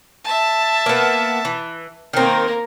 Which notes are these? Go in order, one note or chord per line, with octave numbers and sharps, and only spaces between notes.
E5 A5
A#3 B3
E3
D#3 A#3 C4 A#4